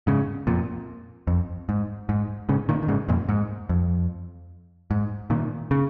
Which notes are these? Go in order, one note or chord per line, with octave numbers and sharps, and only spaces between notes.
G#2 C#3
F2 A#2
F2
G#2
G#2
G#2 C#3
A#2 D#3
D#3
G#2 C#3
F2 A#2
G#2
F2
G#2
A#2 D#3
C#3